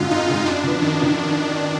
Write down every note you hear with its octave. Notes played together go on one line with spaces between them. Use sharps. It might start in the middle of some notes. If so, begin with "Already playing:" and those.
Already playing: G#1 F#2 D3 G#3 F4
G#1 D#4
F#2 D3 G#3
F#2 D4
D3 F3 B3
F#2 D#3
D3 F3 B3